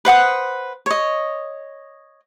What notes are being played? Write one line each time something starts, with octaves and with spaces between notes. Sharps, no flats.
B4 C5 F#5 D#6
C#5 D#5